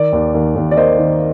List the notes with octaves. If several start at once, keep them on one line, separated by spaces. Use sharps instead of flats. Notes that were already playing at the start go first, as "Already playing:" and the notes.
Already playing: D#3 D5
D#2
D#2
D#2
D5
A#3 C5 D#5
D#3